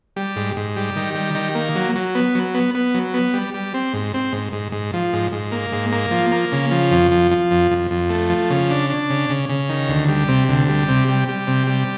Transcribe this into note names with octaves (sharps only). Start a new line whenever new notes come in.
G3
G#2
G#2
G3
D#3
G3
D#3
A#3
F#3
F#3
B3
F#3
B3
B3
F#3
B3
G3
G3
C4
G#2
C4
G#2
G#2
G#2
F3
G#2
G#2
A#3
G#2
A#3
F3
A#3
C#3
F3
F2
F3
F3
F2
F2
F2
A3
F3
C#3
D4
D4
C#3
C#3
C#3
D#3
D2
G3
C3
D2
G3
C3
G3
G3
C3
G3